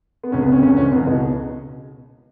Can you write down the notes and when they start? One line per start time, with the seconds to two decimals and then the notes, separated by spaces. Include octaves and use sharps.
0.23 B3
0.32 C#2 C#4
0.42 B3
0.48 C#3 C#4
0.62 C#2 C#4
0.77 E3 C#4
0.91 C#2 B3
1.07 B2 B3 D#4